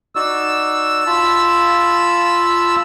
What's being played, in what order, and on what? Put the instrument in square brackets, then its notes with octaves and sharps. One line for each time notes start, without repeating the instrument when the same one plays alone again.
[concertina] D#4 F#4 D5 [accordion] E6
[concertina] F4 A5 B5